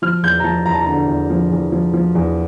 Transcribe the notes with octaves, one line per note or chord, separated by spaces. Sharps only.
F3 F6
E2 G6
A#5
F3 A5
E2 A#5
A5
A#5
D3
E2
F3
E2
F3
F3
E2